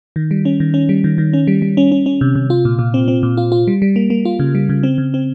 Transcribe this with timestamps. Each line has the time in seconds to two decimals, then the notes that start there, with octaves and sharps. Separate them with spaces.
0.16 D#3
0.31 G3
0.45 C#4
0.60 D#3
0.74 C#4
0.89 G3
1.04 D#3
1.18 D#3
1.33 C#4
1.47 G3
1.62 G3
1.77 C#4
1.92 C#4
2.06 C#4
2.21 C3
2.35 C3
2.50 F4
2.65 A#2
2.79 A#2
2.94 C4
3.08 C4
3.23 A#2
3.37 F4
3.52 F4
3.68 G3
3.82 G3
3.96 A#3
4.10 A#3
4.25 F4
4.39 C#3
4.55 G3
4.69 C#3
4.83 C4
4.98 C#3
5.14 C4